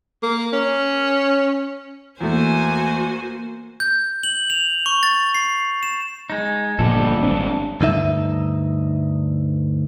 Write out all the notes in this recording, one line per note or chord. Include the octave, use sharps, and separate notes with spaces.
A#3
C#4
E2 A3 A#3 F#4 C5 G#5
G6
F#7
F7
C#6
A6
C7
E7
G#3 D#4
G1 A#2 F3 G3 A4
G#1 C4 D4
D2 G2 D#4 E5